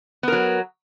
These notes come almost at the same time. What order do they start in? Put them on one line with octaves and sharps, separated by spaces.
B3 A#4 F#3